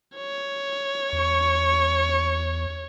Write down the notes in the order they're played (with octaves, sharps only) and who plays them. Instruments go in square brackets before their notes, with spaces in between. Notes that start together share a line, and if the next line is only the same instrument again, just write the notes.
[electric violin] C#5
[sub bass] E2 [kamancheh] C#6